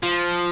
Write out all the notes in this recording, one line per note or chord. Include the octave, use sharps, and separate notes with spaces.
F3